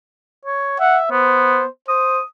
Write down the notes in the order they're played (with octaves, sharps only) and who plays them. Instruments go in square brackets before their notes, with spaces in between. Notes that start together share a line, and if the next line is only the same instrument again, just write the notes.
[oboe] C#5
[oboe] E5 [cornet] F#5
[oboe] B3 [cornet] C5
[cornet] C5 [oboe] D#6